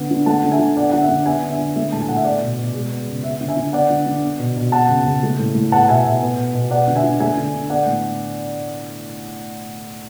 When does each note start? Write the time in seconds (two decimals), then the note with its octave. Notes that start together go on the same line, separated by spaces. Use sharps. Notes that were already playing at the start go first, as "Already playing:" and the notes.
Already playing: D3 B3
0.11 D3
0.26 A3 F#5 A5
0.44 D3
0.51 E5 G#5
0.59 D3
0.77 B3 D5 F#5
0.92 D3 F#5
1.01 E5
1.09 D3
1.26 B3 E5 G#5
1.43 D3
1.50 E5
1.59 D3
1.76 A3 E5
1.92 A2 A5
2.01 G#5
2.08 A2 F#5
2.17 E5
2.25 B3 D5
2.42 B2
2.59 B2
2.74 G#3
2.90 B3
3.08 C#3
3.23 B3 E5
3.41 D3
3.48 E5 G#5
3.57 D3
3.73 B3 D5 F#5
3.90 D3
4.06 D3
4.23 B3
4.39 B2
4.57 B2
4.72 B3 F#5 A5
4.89 C#3
5.05 C#3
5.23 A3
5.39 A2
5.55 A2
5.72 B3 F#5 A5
5.88 B2 E5 G#5
6.04 B2 E5
6.22 B3
6.38 B2
6.55 B2
6.70 B3 D5 F#5
6.88 D3
6.96 E5 G#5
7.04 D3
7.20 A3 E5 G#5
7.37 D3
7.53 D3
7.69 B3 D5 F#5
7.86 A2